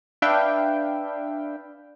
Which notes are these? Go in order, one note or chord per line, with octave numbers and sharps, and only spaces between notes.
D4 B4 E5 F5 G5